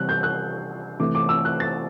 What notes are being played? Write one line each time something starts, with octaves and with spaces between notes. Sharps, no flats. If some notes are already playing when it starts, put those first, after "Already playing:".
Already playing: C3 E3 G3 F#6
G6
F#6
C3 E3 A3 D6
D6
E6
F#6
A6